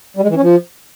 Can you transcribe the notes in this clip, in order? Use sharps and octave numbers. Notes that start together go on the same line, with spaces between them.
G3
G#3
E3
C#4
F3